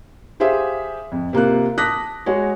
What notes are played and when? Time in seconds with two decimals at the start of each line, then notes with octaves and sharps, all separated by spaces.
0.40 G4 G#4 C5 E5 F5
1.12 F2
1.33 C3 A#3 F4 F#6
1.78 A5 D6 D#6 F#6 A#6 B6
2.26 G#3 F#4 C#5